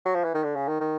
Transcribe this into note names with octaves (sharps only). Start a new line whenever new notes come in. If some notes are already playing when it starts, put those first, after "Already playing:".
F#3
F3
E3
D#3
D3
C#3
D#3
D#3